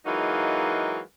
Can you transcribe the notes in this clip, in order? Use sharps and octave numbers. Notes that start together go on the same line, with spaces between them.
E3 F#3 G#3 A#3 D#4 F4